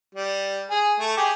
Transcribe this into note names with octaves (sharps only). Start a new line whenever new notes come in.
G3
G#4
A3
G4 G#4